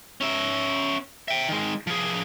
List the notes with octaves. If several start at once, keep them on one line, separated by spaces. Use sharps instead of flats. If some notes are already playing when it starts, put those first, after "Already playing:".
C#4 E5
E5 G5
D#3 G#3
F3 G#4